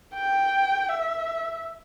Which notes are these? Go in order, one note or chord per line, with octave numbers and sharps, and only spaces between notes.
G5
E5